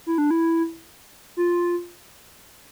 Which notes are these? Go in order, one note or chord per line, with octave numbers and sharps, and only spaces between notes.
E4
D4
E4
F4